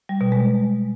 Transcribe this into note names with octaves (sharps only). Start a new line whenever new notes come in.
G3
B2
G#3